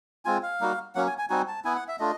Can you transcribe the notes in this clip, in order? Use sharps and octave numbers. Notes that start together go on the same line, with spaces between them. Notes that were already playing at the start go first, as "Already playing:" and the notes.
G#3 C4 F4 G#5
F5
G3 A#3 D#4 F#4
F#3 A#3 C#4 F#5
G#5
G#5
G3 C4 D#4 F#4 G#5
A5
B3 E4 G#5
F#5
E5
A3 D4 F4 D#5